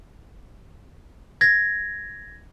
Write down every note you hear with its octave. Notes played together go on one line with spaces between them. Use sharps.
G#6 A#6